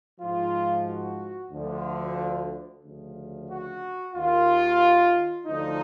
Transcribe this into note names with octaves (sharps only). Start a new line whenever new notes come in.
G#2 F3 F4
F#4
D2 D3 F3
D2 C#3 F3
F#4
D#2 D#3 F4
D2 D3 F3 D#4